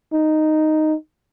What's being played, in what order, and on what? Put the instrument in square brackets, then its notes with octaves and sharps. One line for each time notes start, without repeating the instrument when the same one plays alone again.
[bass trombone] D#4